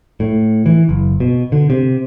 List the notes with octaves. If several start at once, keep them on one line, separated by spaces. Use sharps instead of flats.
A2
E3
F#1
B2
D3
C3